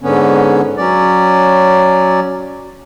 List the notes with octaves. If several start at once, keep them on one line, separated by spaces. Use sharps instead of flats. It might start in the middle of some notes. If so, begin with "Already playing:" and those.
G#2 D3 B3 C#4
F#3 C#4 D5